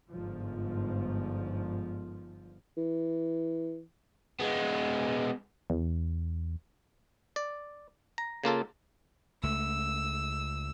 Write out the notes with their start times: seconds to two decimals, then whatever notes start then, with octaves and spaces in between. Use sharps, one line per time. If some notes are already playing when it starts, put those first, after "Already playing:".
0.10 G1 G#2 F3
2.77 E3
4.39 G#3 B3
5.70 E2
7.36 D5
8.18 A#5
8.44 C#3 A#3 F4 A4
9.43 C#2 A3 E6